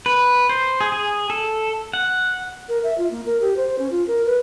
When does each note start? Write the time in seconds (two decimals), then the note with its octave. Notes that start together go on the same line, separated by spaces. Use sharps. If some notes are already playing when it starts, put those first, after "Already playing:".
0.06 B4
0.49 C5
0.81 G#4
0.92 G#4
1.30 A4
1.93 F#5
2.69 A#4
2.83 E5
2.98 F4
3.11 A#3
3.26 A#4
3.41 G4
3.56 C5
3.79 C#4
3.91 F4
4.07 A#4
4.26 B4